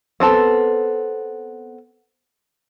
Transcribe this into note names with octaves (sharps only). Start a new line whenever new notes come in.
B3 C4 A4